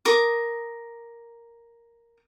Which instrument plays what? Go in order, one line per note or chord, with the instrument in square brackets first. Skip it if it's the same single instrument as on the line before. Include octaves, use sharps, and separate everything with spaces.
[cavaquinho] A#4 D6 D#6